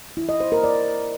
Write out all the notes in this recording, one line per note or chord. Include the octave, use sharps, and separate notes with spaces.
E4
D#5
C5
A#4
D5